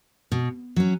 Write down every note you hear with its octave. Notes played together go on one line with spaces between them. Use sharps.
B2
F#3 C#4